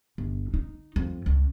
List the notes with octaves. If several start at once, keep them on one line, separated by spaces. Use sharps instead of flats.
G1
D#4
F2
C#2